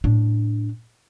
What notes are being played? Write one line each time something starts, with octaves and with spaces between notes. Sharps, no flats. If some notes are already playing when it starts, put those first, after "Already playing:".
A2 D4